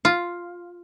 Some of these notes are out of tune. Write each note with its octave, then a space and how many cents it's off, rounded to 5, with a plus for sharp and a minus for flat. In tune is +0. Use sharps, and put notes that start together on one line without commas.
F4 +0